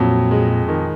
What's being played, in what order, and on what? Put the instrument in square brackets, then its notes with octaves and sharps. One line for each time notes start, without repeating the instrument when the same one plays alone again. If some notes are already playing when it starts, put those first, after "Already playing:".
Already playing: [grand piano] F2 F#3 [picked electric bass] A#2
[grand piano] G#3
D#3